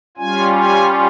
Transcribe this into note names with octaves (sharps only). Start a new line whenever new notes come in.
G3 C#4 F4 G#5
G#5